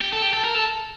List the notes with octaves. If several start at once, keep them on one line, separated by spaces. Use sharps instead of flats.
G4
A4
G4
A4
A#4
A4